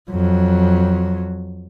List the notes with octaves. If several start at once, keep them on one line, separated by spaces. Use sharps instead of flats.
F2 F#3